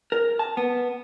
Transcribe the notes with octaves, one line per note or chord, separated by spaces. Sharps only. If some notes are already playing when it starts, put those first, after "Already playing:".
A#4
A5
B3